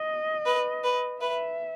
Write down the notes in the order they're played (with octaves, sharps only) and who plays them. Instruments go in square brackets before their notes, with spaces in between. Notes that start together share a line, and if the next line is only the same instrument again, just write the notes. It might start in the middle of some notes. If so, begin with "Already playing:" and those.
Already playing: [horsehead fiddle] D#5
[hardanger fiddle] B4
B4
[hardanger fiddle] B4 [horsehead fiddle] E5